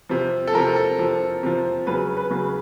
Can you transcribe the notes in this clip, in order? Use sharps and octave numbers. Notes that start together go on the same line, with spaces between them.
C3 F3
A4
C3 F3 A#4
A4
C3 F3
C3 F3
C#3 F#3 B4
B4
C#3 F#3 B4